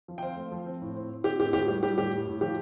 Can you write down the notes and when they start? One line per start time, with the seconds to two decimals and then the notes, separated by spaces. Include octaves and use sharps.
0.08 F3
0.18 G5
0.22 C4 C5 F5
0.36 A3
0.52 F3
0.66 C4
0.81 A2
0.96 C4
1.10 C4
1.24 C4 G4
1.39 A2 G4
1.53 A2 G4
1.68 G3 G4
1.83 G3 G4
1.97 A2 G4
2.11 A2
2.27 A2
2.41 F3 G4